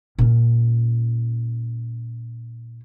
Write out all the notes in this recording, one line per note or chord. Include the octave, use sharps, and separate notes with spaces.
A#2 C#4